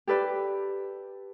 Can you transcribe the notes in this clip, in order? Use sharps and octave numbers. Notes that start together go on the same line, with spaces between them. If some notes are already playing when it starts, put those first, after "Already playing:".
G4 A4 B4 D5